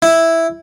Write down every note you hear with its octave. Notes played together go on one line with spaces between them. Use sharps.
E4